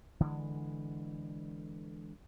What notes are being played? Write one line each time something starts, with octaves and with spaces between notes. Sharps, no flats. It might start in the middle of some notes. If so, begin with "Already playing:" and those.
D3 E3 G3 G#3